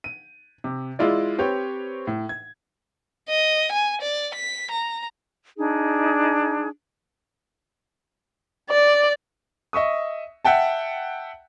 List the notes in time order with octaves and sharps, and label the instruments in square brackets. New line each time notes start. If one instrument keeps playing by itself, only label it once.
[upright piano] D#7
C3
G#3 E4 F4 D5
C4 G4 B4 C#5
A2
G#6
[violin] D#5
G#5
D5
B6
A#5
[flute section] D4 D#4 G#4
[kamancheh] D5
[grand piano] D#5 E5 C#6 D#6
E5 F#5 G5 A5